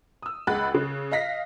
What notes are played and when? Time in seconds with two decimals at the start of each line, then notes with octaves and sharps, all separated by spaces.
0.22 D#6 E6
0.47 C#2 G#4 F#5 B5 F#6 A6
0.74 C#3
1.11 D#5 F5 A#6 B6